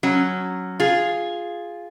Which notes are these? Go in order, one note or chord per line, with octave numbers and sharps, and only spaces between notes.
F#3 C#4
F4 G#4